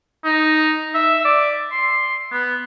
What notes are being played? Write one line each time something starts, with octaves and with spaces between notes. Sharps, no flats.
D#4
E5
D5
C6
B3